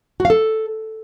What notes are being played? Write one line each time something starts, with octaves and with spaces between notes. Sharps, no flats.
F#4
F5
A4